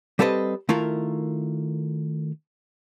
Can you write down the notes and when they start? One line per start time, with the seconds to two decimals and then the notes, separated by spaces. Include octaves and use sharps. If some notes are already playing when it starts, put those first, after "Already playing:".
0.19 G3 C4 A4 B4 C#5 D#5
0.69 D#3 A3 E4 F4 A#4